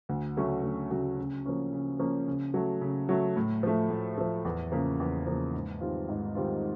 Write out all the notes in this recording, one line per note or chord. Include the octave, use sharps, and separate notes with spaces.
D2
C#3 F#3 A3 C#4
D2
C#3 F#3 A3 C#4
C#3
F3 A#3 C#4
C#3
F3 A#3 C#4
C#3
F#3 A3
C#3
F#3 A3
A2
F3 A3
A2
F3 A3
E2
C#3 F3 A#3
E2
C#3 F3 A#3
G#2
D#3 G3 C4 F4
G#2
D#3 G3 C4 F4